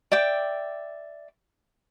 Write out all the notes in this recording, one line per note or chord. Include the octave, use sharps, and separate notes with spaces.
D5 E5 G5 D6